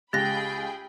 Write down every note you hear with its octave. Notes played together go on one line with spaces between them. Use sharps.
C#2 G4 G#4 G5 B5 F#6 A6 A#6